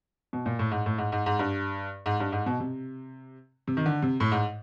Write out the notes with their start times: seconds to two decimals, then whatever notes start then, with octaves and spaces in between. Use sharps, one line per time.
0.33 B2
0.46 A#2
0.59 A2
0.71 G#2
0.86 A2
0.98 G#2
1.12 G#2
1.26 G#2
1.39 G2
2.06 G#2
2.20 G2
2.32 G#2
2.46 B2
2.60 C3
3.67 C3
3.77 D#3
3.86 D3
4.02 C3
4.20 A2
4.32 G#2